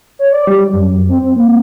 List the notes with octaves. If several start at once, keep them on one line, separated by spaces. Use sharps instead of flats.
C#5
D5
G3
F#2
C4
C4
A#3